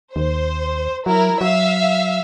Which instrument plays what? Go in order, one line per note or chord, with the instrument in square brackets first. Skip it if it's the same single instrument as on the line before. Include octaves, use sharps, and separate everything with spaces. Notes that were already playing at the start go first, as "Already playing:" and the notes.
[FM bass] D#2 [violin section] C5
[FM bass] F#3 [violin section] E4 A#4
[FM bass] F#3 [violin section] E5 F5